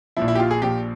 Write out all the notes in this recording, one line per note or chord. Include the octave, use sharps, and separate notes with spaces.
A#1 A#2 F3 E4
E4
G4
F4
G#4
A#1 A#2 F3 G4